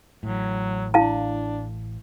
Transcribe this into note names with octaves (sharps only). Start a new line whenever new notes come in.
A1 A2 F#3
D4 E4 F5 A5